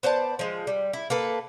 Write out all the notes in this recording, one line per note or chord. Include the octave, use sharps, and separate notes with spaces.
B3 C5 D5 A5
F3 G#3
G3
E4
A#3 A4 B4